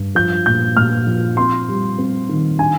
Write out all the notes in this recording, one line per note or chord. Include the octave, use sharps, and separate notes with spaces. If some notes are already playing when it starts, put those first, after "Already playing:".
Already playing: G2
F3 G6
A#2 G6
A#2 F6
F3
C4 C6
G3
C4
D#3
D4 G#5